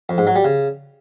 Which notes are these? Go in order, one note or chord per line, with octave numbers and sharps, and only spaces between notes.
F2
G#2
F#3
G3
C#3